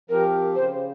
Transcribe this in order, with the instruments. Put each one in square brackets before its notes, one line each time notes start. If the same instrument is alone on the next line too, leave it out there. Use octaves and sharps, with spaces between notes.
[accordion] F3 C4 G4 [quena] A#4
[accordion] C#3 [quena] C5